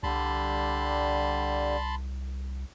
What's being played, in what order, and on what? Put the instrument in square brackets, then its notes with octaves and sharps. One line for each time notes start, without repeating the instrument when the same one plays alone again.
[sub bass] C2 [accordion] D3 G3 [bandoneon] A5 B5 C6